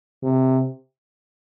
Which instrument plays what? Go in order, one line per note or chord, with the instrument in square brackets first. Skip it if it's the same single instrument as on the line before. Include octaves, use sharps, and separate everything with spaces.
[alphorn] C3